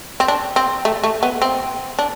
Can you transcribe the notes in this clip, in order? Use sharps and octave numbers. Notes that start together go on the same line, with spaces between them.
C4
D4
C4
A3
A3
B3
C4
D4